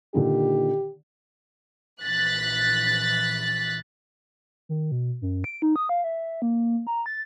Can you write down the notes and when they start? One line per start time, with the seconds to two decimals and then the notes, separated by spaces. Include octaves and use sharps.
0.14 A#2 D3 D#3 G4
2.02 A#1 E3 F#6 A6 B6
4.69 D#3
4.92 B2
5.22 F#2
5.44 D7
5.62 D#4
5.76 D#6
5.89 F5
6.04 E5
6.42 A#3
6.87 A#5
7.06 A6